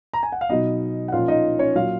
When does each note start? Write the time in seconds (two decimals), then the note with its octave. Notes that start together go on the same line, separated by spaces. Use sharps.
0.13 A#5
0.23 G#5
0.32 F#5
0.41 F5
0.49 B2 F#3 B3 D#4 D#5
1.08 F#5
1.12 A#2 F3 A#3 C#4 F4 F5
1.28 D#4 D#5
1.59 C#4 C#5
1.75 A#2 F#3 A#3 F4 F5